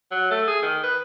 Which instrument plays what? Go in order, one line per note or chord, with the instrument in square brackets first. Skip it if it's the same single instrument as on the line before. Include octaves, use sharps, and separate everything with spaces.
[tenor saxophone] F#3
A3
G#4
D#3
B4